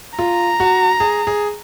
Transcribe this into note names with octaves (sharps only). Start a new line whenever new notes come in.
F4 A#5
F#4
G#4
G#4